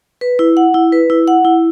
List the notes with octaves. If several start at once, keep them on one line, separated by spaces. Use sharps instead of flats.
B4
E4
F#5
E4
B4
E4
F#5
E4